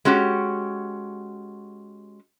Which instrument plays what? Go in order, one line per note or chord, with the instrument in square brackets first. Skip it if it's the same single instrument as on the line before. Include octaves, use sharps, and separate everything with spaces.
[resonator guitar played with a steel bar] G#3 C#4 F#4 G4